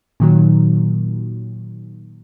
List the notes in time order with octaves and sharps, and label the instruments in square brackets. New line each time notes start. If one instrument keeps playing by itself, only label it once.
[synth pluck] A#2 D#3 F#3